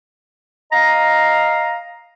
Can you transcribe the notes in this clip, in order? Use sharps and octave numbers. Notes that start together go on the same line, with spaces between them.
D#5 F5 A#5